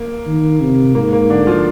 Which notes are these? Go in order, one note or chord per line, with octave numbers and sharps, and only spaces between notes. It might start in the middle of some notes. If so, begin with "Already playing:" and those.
Already playing: A#3
D#3
C3
G#2 A#3
A#3
D3 D4
F3 F4